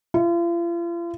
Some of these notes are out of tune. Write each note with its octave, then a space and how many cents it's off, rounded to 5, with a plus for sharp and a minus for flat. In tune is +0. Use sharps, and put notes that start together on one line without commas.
F4 -40